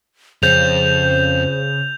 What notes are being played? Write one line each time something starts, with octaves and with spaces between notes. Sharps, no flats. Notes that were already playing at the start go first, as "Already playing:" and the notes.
F2 C#3 C5 G6 F7